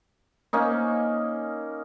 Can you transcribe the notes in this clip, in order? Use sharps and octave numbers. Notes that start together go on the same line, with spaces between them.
A#3 C#4 D#4